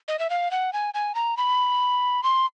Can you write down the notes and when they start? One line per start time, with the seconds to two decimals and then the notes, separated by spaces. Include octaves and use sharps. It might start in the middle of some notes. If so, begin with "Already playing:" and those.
0.08 D#5
0.19 E5
0.30 F5
0.51 F#5
0.73 G#5
0.94 G#5
1.15 A#5
1.37 B5
2.23 C6